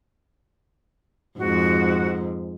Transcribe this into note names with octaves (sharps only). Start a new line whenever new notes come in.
F2 G#2 F#4